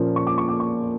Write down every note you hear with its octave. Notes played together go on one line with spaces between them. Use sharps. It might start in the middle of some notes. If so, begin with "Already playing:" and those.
Already playing: A#2 F3 A#3 C#4
C#6
D6
C#6
D6
C#6